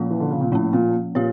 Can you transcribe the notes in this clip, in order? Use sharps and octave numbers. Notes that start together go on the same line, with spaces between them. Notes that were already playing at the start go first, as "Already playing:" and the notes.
Already playing: A#2 F3 A#3 C#4 F4
E3
D3
C#3
A#2
A2 F3 A#3 C#4
A#2
A#2 G4 C#5